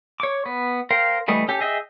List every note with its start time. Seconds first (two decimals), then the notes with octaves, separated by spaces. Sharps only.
0.20 C#5 D6
0.46 B3
0.90 A#4 C5 F5 G5
1.28 E3 G3 A3 D#5
1.48 C#4 G4 A4
1.60 G#4 D#5 E5 G5